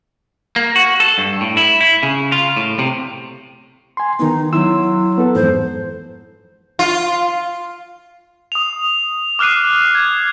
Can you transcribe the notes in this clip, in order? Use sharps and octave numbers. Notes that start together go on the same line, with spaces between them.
A#3
F#4
A4
G2
A2
E4
E4
C#3
F4
A2
C3
G#5 C6
D#3 B3 D#4
F#3 E4 C6 E6
B3 A4
F2 G#2 E3 C5
F4
D#6 F7
D6 F6 F#6 C7 D#7
G#6